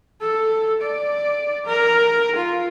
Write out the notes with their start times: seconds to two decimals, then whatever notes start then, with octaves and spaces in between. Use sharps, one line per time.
0.21 A4
0.81 D5
1.66 A#4
2.36 F4